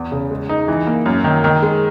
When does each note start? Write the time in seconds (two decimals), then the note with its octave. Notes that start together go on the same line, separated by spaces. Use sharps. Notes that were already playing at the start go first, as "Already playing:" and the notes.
Already playing: E2
0.12 C#3
0.31 G#3
0.49 D#4
0.68 E3
0.87 A#3
1.06 F#2
1.24 D#3
1.44 D#3
1.62 G#3